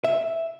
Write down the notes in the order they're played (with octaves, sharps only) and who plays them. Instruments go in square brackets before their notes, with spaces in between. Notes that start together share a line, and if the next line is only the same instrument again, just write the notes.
[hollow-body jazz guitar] E5